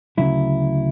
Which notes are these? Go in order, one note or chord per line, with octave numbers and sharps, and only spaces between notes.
D2 C#3 F#3 E4